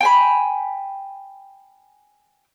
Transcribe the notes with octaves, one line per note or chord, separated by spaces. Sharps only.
G5 G#5 B5